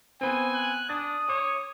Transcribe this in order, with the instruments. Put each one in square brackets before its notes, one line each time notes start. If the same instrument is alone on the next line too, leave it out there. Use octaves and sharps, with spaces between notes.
[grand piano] B3 C4 [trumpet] G#5
[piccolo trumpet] F#6
[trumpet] D4 [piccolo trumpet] D#6 [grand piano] A6
[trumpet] C#5 [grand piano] D6